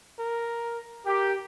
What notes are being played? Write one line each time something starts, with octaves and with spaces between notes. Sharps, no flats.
A#4
G4 A#4